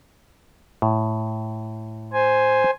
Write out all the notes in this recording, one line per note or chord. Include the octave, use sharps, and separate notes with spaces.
A2
C5 G#5